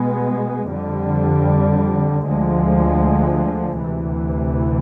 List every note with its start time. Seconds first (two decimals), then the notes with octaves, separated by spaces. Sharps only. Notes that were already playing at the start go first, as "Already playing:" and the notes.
Already playing: B2 G#3 B3
0.71 F2 D3 G3
2.26 D2 D3 F3 G#3
3.81 D2 C3 E3